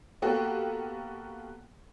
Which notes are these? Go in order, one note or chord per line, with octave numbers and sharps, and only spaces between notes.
A#3 B3 F#4 G4 A4